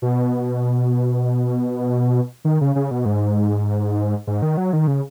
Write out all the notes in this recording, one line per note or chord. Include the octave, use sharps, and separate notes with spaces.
B2
D#3
C#3
C#3
B2
G#2
G#2
D#3
F#3
D#3
C#3